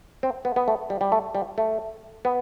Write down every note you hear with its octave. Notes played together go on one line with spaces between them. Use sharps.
C4
B3
B3
A3
G3
G3
A3
G3
A3
B3